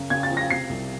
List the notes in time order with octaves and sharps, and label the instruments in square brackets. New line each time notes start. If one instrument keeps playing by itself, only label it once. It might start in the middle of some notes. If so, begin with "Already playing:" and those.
Already playing: [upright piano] F#2 C#3
C#3 G#6
A6
F3
A#6
C3 C7
C2